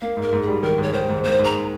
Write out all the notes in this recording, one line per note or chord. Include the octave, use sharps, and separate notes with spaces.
A#3 F5
G#2
A#4
G#2
G#4
G3
D#3 A#4
G#2 C#5
D#3 C5
G#2
A#3 C5
G#2 A#5